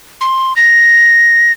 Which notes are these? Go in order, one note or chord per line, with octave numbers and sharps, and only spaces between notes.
C6
A#6